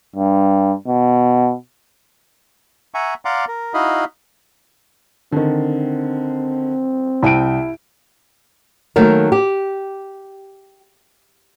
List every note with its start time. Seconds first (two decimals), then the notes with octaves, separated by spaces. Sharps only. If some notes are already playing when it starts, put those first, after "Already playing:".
0.16 G2
0.88 B2
2.94 E5 F#5 G#5 A#5 C#6
3.25 D5 F5 F#5 A#5 C6 D6
3.48 A#4
3.74 D#4 E4 F#4 D#5 F5 B5
5.32 D3 D#3 C4
7.23 C2 E4 G5 D7 D#7
8.96 D#3 F#3 A3 A#3 A#4
9.32 G4